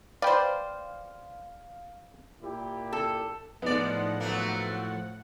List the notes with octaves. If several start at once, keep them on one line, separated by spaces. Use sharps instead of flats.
B4 C5 D5 F5 G5
A#2 E4 G4
A4
A2 F3 G#3 B3 D#4 D5 F#5
F#3 A3 A#3